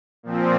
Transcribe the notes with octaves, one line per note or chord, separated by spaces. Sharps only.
A#2 F3 C4